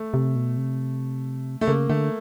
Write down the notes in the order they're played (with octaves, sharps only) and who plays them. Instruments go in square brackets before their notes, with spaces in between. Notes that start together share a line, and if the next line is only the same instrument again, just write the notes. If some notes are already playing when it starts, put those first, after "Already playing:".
Already playing: [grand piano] A3
[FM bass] C3
B2
C3
[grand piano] A3
[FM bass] C#3 [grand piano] A#3
[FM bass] D3 [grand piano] A3